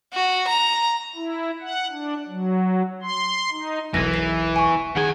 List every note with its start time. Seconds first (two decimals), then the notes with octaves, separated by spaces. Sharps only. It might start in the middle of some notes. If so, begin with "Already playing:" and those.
0.13 F#4
0.48 A#5
1.15 E4
1.61 F#5
1.91 D4
2.28 F#3
3.02 C6
3.52 D#4
3.94 E1 B1 E2 E3 A#6
4.14 C7
4.56 G#5 C#6
4.97 D#3 G#4 F#5 G#5